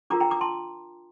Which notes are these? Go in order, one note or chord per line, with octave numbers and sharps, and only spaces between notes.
D4 F4 A#4 A#5 D6
G5 A#5
A#5 D6
A5 C6